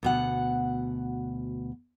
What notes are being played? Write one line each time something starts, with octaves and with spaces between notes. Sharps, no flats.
D2 B2 F#5